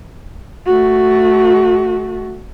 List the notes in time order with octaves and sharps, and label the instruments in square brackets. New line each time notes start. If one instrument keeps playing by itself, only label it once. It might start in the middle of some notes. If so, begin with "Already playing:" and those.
[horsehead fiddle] A3 F#4